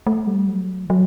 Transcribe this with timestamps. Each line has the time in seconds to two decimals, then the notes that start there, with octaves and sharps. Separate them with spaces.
0.07 A3
0.27 G3
0.48 F#3
0.85 E3
0.90 F#3